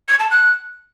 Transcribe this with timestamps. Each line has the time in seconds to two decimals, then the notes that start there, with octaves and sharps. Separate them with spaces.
0.08 G#6
0.20 A5
0.31 F#6